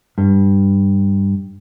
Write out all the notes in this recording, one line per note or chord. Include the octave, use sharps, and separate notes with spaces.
G2